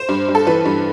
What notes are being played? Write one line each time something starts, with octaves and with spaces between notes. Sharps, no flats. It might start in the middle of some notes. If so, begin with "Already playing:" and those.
Already playing: C5
G2
G2
A4
E3 B4
G2